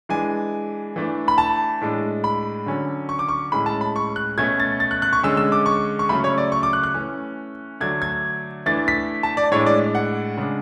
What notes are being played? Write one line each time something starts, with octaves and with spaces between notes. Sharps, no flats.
E3 G#3 D4 G#5
E3 A3 D4
B5
A5
A2 G#3 D4
B5
D3 F#3 C#4
C#6
D6
C#6
A2 G#3 C#4 B5
A5
B5
C#6
F#6
B2 A3 C#4 G#6
A6
A6
F#6
F#6
C#6
D3 G#3 C#4 E6
E6
D6
C#6
C#6
C#3 F#3 A3 C#4 B5
C#5
D5
C#6
D6
F#6
F#6
E3 A3 C#4
D3 F#3 A3 D4 G#6
G#6
E3 A3 D4 A6
B6
A5
D5
A2 G#3 D4 C#5
D5
F#5
C#3 G#3 D4